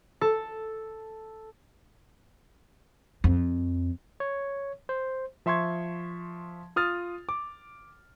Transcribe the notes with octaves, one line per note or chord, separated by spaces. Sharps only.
A4
F2
C#5
C5
F3 E5 C6 C#6 G#6
F4 D#6 F6 A6
D6